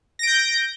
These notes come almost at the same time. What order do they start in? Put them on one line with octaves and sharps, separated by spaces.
A#6 D7 G6